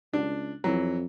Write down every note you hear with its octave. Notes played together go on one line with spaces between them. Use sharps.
C#2 D4
F2 E3 F#3